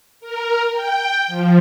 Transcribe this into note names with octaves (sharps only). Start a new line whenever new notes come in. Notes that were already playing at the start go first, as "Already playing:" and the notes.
A#4
G5
F3